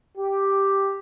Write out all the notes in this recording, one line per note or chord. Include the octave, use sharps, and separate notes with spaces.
G4